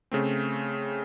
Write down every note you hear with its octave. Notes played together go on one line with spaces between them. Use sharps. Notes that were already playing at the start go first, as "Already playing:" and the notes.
C#3 A3 C4